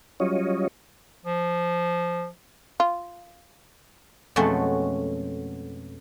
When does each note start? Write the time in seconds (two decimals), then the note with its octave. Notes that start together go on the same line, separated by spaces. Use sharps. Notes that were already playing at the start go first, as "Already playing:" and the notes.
0.20 F#3 G3 C#4 F4 C#5 D#5
1.26 F3
2.80 F4
4.36 F2 B2 F#3 G#3 A3 C#4